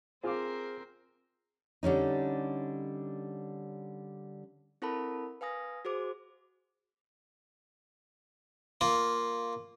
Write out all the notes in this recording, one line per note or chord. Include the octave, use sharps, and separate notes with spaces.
C4 F4 G#4 A#4 C5 F5 D6
D3 G3 C#4 D#4
C4 E4 A4 A#4 A5 B5
B4 F5 G#5 D#6 A#6
F#4 G#4 C5 D6
A#3 F4